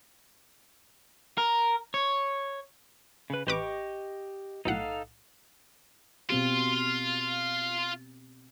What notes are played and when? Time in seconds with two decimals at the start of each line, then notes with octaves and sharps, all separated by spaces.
1.38 A#4
1.94 C#5
3.30 C#3 B4
3.47 A1 G4 B4 D#5 C#6 D6
4.65 B1 A2 D#4 A4 F5 F#5
6.30 B2 C4 F4 G4